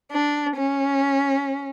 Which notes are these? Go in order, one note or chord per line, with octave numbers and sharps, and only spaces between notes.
D4
C#4